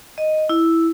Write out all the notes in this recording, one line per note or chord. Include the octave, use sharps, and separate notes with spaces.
D#5
E4